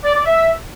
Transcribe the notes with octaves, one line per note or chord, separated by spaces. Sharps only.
D5
D5
E5